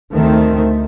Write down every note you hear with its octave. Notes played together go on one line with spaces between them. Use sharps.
D2 D#3 A3 C4